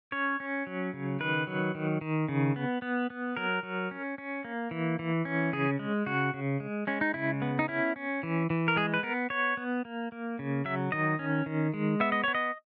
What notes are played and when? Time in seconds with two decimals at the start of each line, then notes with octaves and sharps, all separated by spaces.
0.12 C#4 C#5
0.40 C#4
0.67 F#3
0.93 C#3
1.20 D#3 B4
1.47 F#3
1.75 D#3
2.01 D#3
2.28 C#3
2.56 B3
2.82 B3
3.10 B3
3.37 F#3 A#4
3.63 F#3
3.91 C#4
4.18 C#4
4.45 A#3
4.71 E3
4.99 E3
5.25 C#4
5.53 C#3 G#4
5.79 G#3
6.06 C#3 F#4
6.34 C#3
6.60 G#3
6.87 G#3 C#4
7.01 D#4
7.14 C#3 E4
7.42 B3
7.59 D#4
7.68 C#4 E4
7.96 C#4
8.23 E3
8.50 E3
8.68 A#4
8.76 G#3 G#4
8.94 B4
9.03 B3 A#4
9.30 B3 C#5
9.57 B3
9.85 A#3
10.12 A#3
10.39 C#3
10.65 F#3 E5
10.92 D#3 D#5
11.19 C#4
11.46 D#3
11.74 G#3
12.00 B3 E5
12.12 D#5
12.24 B3 C#5
12.35 D#5